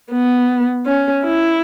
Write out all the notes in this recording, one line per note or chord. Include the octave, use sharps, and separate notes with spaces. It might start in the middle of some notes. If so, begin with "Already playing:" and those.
B3
C#4
E4